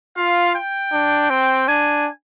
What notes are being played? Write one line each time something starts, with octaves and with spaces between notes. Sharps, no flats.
F4 F5
G5
D4
C4 G5
D4 G#5